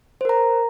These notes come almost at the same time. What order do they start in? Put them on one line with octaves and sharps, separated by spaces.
C5 A#4 A#5